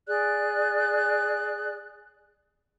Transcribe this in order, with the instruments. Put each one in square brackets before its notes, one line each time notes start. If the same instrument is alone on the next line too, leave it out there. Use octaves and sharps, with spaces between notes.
[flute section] G#4 D5 F#6